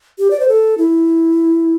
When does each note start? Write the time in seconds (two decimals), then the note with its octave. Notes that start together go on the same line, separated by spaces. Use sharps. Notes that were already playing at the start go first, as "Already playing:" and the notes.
0.19 G4
0.31 D5
0.40 C5
0.48 A4
0.78 E4